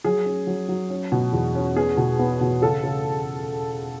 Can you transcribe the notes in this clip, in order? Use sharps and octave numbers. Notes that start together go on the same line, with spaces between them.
F#3 G#4
C#4
F#3
F#3
C#4
B2
E2
C#4
B3 G#4
B2
B3
B2
C#3 A4
C#3